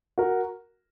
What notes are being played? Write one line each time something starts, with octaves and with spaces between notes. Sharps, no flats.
F#4 A#4